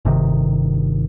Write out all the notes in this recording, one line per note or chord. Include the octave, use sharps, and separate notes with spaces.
G1 C3 D#3